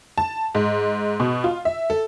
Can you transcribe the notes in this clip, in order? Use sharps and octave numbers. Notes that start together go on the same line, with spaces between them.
A5
G#2
B2
F4
E5
A4